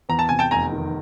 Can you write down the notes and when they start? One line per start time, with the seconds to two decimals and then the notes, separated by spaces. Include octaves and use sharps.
0.09 E2 A#5
0.19 A5
0.29 C3 G#5
0.39 G5 A5
0.51 F1 G#5 A#5
0.72 D#3